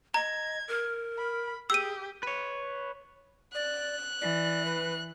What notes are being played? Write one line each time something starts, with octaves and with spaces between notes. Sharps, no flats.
D#5 A#5 G#6
A#4
B5
G4 G#4 E6 D#7
B4 C#5
D5 F#6
E3 D5
B4